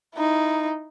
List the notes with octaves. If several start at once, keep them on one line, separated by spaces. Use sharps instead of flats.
D#4 E4